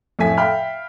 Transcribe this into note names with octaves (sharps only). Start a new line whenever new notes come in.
F2 A2 A3 E5 G#5 B6
E5 F5 G5 B5 F6